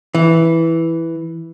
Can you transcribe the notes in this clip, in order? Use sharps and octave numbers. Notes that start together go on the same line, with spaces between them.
E3